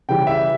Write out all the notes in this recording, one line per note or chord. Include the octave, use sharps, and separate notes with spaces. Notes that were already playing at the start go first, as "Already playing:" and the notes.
C#3 E3 G3 G5
E5